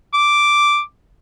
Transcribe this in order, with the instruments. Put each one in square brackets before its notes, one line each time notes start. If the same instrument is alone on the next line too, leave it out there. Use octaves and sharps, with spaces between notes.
[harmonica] D6